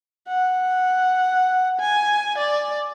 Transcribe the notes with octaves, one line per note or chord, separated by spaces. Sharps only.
F#5
G#5
D5